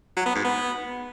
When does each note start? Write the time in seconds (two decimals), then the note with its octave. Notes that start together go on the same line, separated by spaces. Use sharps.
0.16 F#3
0.26 B3
0.35 G#2
0.44 B3